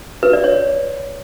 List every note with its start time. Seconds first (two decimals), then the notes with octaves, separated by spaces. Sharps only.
0.23 B4
0.33 D5
0.44 C#5